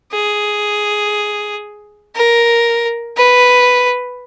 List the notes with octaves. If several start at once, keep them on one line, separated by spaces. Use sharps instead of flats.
G#4
A#4
B4